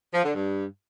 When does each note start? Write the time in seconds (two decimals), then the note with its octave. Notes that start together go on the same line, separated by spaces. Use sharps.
0.14 F3
0.24 D3
0.34 G2